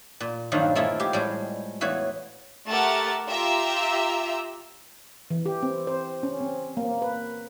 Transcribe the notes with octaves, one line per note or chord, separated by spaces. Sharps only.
A#2
G2 A#2 D#3 F3 F#3
A3 A#3 C4 E4 F4 G#4
G#3 G4
A2 G3 G#3
E2 E3 F#4 C#5
A3 G4 A#4 E5 F#5 A6
F4 G4 E5 G5 A#5 E6
E3
G4
C4
C5
C#4
C4
A#3
B4